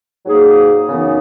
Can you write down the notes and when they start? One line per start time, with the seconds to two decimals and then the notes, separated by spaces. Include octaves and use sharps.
0.26 G#2 F#3 A#3 D#4 G#4
0.89 F#2 C#3 E3 B3 D#4